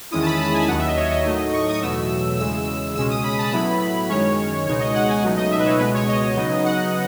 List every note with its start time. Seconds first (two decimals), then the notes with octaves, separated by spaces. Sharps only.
0.11 E2 D#3 G#3 C#4 E4 D#6
0.22 A5
0.26 B5
0.39 A5
0.53 G#5
0.68 D#2 D#3 F#3 F#5
0.78 E5
0.87 D#5
0.96 C#5
1.10 D#5
1.25 A2 F#3 A3 D#4
1.53 C#6
1.67 D#6
1.82 E2 B2 F#3 A3 E6
2.38 E2 C#3 G#3 E6
2.95 C#2 B2 G#3 C#4 E6
3.10 D#6
3.24 B5
3.38 A5
3.52 A2 F#3 B3 E4 B5
4.08 F#2 D#3 G#3 C#4 C#5
4.66 C#2 B2 G#3 D#4 C#5
4.80 D#5
4.94 F#5
5.08 G#5
5.22 C#2 B2 F#3 A3 D#4
5.37 D#5
5.51 E5
5.59 B4
5.65 C#5
5.79 C#2 B2 G#3 B3 B4
5.94 C#5
6.08 D#5
6.36 C#3 F#3 B3 D#4
6.64 F#5